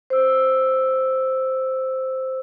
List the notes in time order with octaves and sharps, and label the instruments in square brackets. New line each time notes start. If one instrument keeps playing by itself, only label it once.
[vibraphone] C5 E6